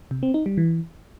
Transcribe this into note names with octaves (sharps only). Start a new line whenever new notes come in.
C3
C4
D#4
G3
E3